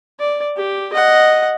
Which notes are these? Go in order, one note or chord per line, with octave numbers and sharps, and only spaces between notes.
D5
G4
D#5 F#5